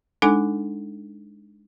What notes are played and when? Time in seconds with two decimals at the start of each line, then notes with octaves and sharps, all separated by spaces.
0.22 G#3 D4 D#4 A4 G#5 D6